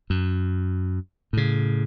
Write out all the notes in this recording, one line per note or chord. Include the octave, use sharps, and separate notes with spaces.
F#2
A2 C#3